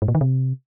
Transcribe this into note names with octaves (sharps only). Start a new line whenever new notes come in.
G#2
A#2
D#3
C3